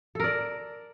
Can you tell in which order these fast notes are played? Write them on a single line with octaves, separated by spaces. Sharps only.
A4 A#4 D5